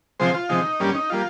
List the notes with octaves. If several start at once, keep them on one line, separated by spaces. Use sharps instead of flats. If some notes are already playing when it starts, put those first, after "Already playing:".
C3 F3 G#3 C5
F4
C3 F3 G#3 D#4
G2 G3 A#3 C#4
D#4
G3 A#3 F4